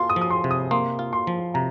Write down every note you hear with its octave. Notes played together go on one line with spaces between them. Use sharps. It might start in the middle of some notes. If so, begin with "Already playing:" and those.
Already playing: A#3 F4 C6
D#6
F3
D#6
C6
C3
D#6
A#3 C6
F4
C6
F3
C3 A#5